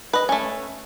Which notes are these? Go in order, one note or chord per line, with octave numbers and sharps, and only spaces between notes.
B4 D#5
A3 C#4